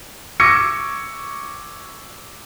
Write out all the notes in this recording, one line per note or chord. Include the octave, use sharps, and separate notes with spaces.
C#6 D6 E6 G#6 A#6 C#7